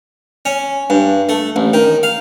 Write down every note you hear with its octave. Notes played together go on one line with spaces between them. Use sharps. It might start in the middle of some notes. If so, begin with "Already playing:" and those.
C#4
G2
A3
A1
D#3
F5